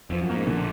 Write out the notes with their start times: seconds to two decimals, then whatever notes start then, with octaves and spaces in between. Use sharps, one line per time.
0.10 F2 F3
0.22 F#2
0.29 A#3
0.34 G#2
0.46 A#1 A#2 D3